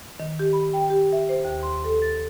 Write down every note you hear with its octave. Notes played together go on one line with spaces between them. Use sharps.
D#3
G4
B5
G5
G4
E5
C5
D#2
C6
A4
A6